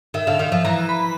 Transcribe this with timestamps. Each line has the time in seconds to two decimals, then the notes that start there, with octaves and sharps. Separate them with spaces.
0.14 D#3 E5
0.27 D3 F5
0.39 D#3 F5
0.52 F3 E5
0.65 E3 A#5
0.89 B5